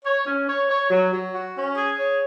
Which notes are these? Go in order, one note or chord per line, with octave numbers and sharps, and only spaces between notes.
C#5
C#4
C#5
C#5
F#3
F#3
F#4
C#4
G#4
C#5